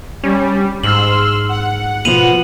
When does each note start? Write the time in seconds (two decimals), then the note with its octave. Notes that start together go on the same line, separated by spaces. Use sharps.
0.24 G3 C#4
0.84 G#2 C6 E6 F6 F#7
1.49 F#5
2.05 B2 F3 D#7 F7 F#7